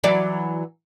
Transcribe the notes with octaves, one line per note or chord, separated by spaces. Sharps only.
E3 F#3 D5